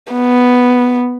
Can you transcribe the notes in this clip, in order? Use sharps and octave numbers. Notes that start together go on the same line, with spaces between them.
B3